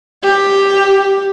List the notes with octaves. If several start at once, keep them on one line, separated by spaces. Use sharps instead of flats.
G4